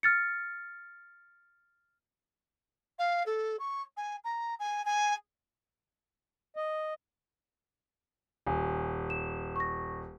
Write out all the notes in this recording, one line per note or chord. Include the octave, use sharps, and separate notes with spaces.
F6 A6 C#7
F5
A4
C#6
G#5
A#5
G#5
G#5
D#5
D#1 G#5
E7
C#6 A#6